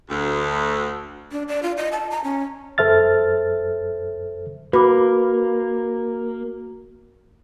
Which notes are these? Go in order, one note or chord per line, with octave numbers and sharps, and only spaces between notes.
D2
D4
D5
F4
D#5
A5
A#5
C#4
F#2 A4 C5 E5 F6 A6
A#3 F#4 B4 D6